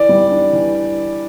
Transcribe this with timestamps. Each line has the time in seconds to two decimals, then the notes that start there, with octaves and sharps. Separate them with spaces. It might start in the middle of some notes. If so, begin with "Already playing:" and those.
Already playing: E3 D5
0.09 G3
0.32 D4
0.53 E3